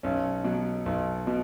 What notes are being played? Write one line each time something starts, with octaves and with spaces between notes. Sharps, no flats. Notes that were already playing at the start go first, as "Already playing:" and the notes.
B1 C#4
B2 F#3
B1
B2